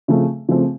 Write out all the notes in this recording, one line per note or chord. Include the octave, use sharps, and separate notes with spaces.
C#3 F3 A3 C4
C#3 F3 A3 C4